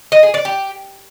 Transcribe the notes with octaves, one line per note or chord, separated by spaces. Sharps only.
D#5
G#4
D5
G4